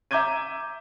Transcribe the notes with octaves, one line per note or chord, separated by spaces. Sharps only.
E5 A#5 D6 G6 G#6 D#7